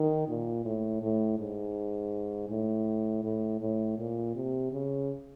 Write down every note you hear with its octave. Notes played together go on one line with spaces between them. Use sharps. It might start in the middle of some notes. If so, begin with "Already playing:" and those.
Already playing: D#3
A#2
A2
A2
G#2
A2
A2
A2
A#2
C3
C#3